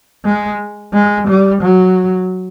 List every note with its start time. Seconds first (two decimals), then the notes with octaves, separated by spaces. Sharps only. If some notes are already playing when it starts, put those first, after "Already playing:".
0.25 G#3
0.94 G#3
1.28 G3
1.62 F#3